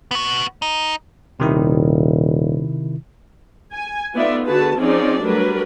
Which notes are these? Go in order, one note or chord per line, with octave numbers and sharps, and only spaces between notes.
B3 F#4
D#4
D#1 C3 D#3 E4
G#5
A3 B3 D#4 F4 D5 E5
D3 F#4 G#4 B4 A5
F3 C4 C#4 D#4 G#4 D5
F#3 G3 A3 D4 A#4 B4